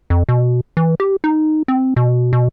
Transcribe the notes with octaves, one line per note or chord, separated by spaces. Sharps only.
F2
B2
E3
G4
D#4
C4
B2
B2